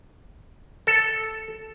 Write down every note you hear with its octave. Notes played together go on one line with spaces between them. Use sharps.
A4